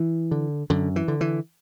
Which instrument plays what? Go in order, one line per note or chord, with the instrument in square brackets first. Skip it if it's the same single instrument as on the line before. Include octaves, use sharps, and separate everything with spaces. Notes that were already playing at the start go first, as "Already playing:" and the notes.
Already playing: [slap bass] E3
D3
F#2 D3
E3
D3
E3